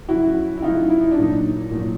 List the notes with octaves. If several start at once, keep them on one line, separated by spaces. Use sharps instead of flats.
C#3 F#3 E4 F#4
E4
C#3 F#3 D#4 F4
E4
D#4
D4
A#2 F#3 D#4
A#2 F#3